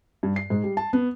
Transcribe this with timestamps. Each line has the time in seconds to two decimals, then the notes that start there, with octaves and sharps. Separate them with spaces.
0.23 G2
0.36 C7
0.50 G#2
0.63 G3
0.77 A5
0.93 B3